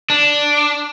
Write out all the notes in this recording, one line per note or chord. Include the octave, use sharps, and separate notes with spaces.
D4